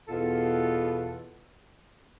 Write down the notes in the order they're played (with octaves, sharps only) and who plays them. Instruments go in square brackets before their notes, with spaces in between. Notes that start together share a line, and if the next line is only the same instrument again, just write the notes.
[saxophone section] E2 B2 B3 F4 A4